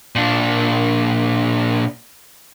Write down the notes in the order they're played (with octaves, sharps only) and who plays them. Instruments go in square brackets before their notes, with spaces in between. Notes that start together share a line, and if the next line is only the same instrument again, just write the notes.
[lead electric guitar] A#2 D4